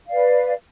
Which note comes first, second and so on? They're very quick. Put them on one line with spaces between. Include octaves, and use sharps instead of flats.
F5 D5 B4